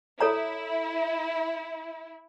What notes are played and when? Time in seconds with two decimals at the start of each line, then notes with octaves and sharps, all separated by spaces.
0.21 E4 A4 C#5 A#5